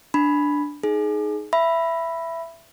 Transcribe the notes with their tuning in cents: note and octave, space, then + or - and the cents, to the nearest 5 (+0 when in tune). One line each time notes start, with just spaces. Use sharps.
D4 +0 B5 +0
D#4 +0 G#4 +20
E5 +15 B5 +0